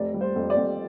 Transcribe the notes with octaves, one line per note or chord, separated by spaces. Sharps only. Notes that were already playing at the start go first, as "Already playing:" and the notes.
Already playing: F1 D5
G3
C5
F2
D5
F2